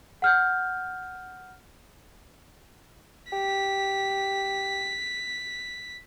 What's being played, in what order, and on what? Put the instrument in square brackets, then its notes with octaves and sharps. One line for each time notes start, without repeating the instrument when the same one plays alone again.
[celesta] F#5 F6 G6
[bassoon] G4 [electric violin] B6